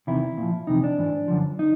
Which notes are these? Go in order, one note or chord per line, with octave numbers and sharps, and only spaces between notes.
E2 C3 D#3 E4
A#2
F3
F2 C3 E3 D#4
D4
G#2 E3
F#2 D3 F3
D#4